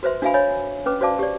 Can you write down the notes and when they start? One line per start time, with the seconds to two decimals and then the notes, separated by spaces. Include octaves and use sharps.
0.03 F#4 B4 C5 E5 C6
0.22 D4 F#4 E5 F5 G#5 B5
0.34 C#5 D#5 G#5 B5
0.86 C#4 B4 D6
1.01 F#4 C5 D5 F5 A5 D6
1.19 G4 D5